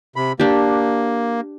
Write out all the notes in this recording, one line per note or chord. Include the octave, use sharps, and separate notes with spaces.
C3 B5
A#3 D4 G4